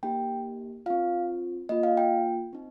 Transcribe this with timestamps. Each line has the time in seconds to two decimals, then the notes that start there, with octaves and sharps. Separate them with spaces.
0.03 A#3 D#4 G4 G5
0.86 C4 F4 F5
1.69 A#3 F4 D#5
1.83 F5
1.97 G5
2.53 C4 D#4